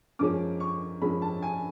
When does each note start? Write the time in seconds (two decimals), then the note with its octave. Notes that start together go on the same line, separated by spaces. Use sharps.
0.19 F#2 F3 G#3 C#4 D6
0.60 C#6
1.01 F#2 F3 G#3 C#4 B5
1.22 A5
1.42 G#5